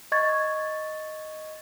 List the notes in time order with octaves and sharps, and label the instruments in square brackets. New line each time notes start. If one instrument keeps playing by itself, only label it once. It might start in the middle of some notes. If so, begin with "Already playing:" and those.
[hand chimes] D#5 C#6 G#6 A6